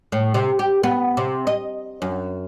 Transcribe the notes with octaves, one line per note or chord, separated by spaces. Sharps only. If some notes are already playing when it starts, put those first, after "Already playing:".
A2
C3
G4
B3
C3
D#5
F#2